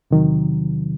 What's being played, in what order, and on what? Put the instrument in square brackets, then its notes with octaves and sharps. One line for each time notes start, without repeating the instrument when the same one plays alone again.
[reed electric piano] E2 C3 D#3 F#3